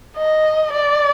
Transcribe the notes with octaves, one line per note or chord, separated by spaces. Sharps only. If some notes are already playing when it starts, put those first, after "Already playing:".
D#5
D5